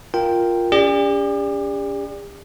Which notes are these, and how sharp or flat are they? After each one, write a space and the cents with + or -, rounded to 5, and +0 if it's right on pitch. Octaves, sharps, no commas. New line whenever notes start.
F4 +0 A#4 +0 G5 +0
C#4 +40 G4 +45 D5 +0